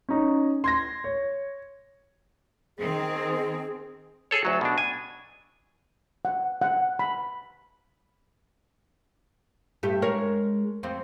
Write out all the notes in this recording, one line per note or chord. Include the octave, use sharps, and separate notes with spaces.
C#4 D#4
C6 G#6 A#6
C#5
D#3 C4 G#4
G#4 A4 C#5
D2 F#3
B2 D4
G#5
F#5
F#5
B5
G2 A3 G4
G#3 A#4 C#5
F2 C4